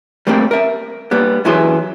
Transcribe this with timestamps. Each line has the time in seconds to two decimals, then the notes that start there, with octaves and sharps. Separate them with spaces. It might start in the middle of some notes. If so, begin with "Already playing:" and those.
0.27 G3 A3 A#3 C4 G4
0.51 A#4 E5
1.11 G3 A#3 B3
1.45 F#2 E3 F#3 E4 G#4 C6